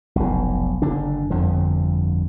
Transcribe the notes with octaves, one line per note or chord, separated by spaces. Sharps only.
F1 B1
F#1 D3 D4
G1 F2 D3 F3